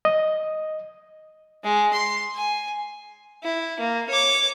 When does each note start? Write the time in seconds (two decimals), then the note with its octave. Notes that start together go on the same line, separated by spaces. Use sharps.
0.05 D#5
1.64 G#3
1.93 C6
2.34 G#5
3.43 E4
3.80 A#3
4.10 C#5 D6